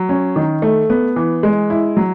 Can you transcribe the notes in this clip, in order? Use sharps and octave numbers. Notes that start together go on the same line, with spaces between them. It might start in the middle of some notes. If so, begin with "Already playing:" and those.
Already playing: F#3
C#4
D#3
A3
B3
E3
G#3
E4
F#3